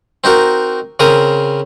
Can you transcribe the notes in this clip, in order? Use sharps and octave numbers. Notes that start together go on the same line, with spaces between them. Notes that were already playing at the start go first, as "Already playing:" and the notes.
C4 D#4 F#4 A#4
C#3 C4 A#4 D#6